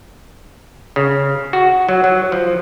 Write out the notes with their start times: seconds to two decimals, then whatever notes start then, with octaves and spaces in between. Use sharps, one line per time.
0.96 C#3
1.53 F#4
1.89 F#3
2.04 F#3
2.32 F3